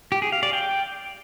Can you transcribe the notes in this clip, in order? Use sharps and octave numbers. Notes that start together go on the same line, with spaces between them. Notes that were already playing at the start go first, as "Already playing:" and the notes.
G4
G#4
F5
D5
G5